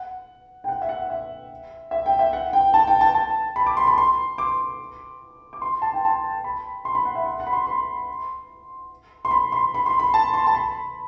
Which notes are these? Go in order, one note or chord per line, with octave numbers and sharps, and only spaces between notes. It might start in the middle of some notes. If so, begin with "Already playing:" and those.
Already playing: F#5
G5
F#5
E5
F#5
E5
E5
G5
E5
F#5
G5
A5
G5
A5
A5
B5
D6
C6
B5
C6
D6
D6
C6
A5
G5
A5
B5
C6
B5
F#5
E5
F#5
F#5
B5
C6
C6
C6
B5
C6
B5
C6
B5
A5
C6
A5
B5